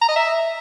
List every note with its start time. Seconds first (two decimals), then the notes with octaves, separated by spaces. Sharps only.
0.02 A#5
0.09 D#5
0.16 E5